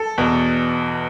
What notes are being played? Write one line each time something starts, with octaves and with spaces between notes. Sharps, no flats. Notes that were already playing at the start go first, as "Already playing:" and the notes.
Already playing: A4
E2 B2